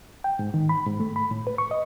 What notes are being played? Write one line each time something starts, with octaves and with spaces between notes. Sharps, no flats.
G5
G#2
D#3
B5
G#2
A3
B5
A2
B4
C#6
D#5